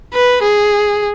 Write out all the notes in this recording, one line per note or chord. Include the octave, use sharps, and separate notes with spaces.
B4
G#4